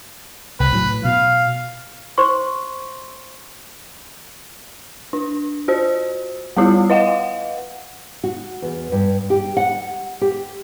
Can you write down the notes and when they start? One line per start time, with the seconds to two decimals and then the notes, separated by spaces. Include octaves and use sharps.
0.60 C2 B4
0.72 A2 F#3
1.05 B2 F5
2.18 C5 C6 C#6
5.13 D4
5.68 F4 F#4 C5
6.57 G3 B3 E4 F4
6.90 B4 D#5 F5 F#5
8.24 F#4
8.62 E2
8.92 G2
9.30 G4
9.57 F#5
10.21 G4